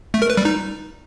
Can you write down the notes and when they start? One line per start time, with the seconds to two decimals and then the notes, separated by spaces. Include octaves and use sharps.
0.14 A3
0.22 A#4
0.30 B4
0.37 G3
0.45 D#4